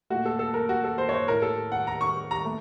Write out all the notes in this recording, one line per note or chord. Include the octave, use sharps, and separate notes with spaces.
A#2 A3 F#4
A4
A4
A#4
F#4
A4
C5
C#5
C5
A2 A3 A#4
A4
F#5
A#5
C#6
A#5
A3